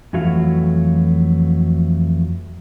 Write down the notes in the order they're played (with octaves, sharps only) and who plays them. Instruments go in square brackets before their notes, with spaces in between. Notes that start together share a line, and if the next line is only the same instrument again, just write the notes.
[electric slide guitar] F2 E3 F#3 A3 F#4 F5